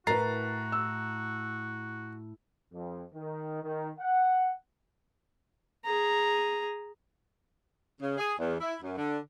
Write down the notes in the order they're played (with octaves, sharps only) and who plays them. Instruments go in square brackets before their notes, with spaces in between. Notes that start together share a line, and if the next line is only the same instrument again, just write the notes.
[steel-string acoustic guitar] A2 [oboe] F#4 [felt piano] A#4 B4 [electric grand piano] A#5 A6 C7
[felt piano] E6
[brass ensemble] F2
D#3
D#3
F#5
[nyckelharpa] G#4 A#5
[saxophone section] C#3
G#4
E2
E4
F#2
D3